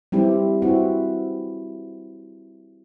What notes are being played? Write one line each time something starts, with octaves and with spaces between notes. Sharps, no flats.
G3 C4 E4 G4
C4 E4 F#4